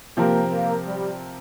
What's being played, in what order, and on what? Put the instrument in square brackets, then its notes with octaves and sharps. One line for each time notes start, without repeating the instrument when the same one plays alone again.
[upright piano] C3 F3 C4 G4 A#4 [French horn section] A#3
[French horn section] A#3
G3